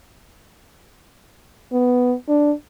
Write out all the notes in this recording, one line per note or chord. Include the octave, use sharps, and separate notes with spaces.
B3
D4